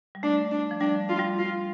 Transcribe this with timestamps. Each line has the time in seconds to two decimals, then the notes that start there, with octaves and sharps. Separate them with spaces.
0.15 G3
0.23 A3 D4
0.52 D4
0.71 F3
0.80 G3 D4
1.09 F4
1.19 G3
1.38 F4